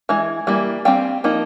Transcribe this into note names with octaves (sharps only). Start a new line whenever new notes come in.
E3 G#3
E3 G3 A#3
G3 C4 F5 G5
F3 A#3 D#4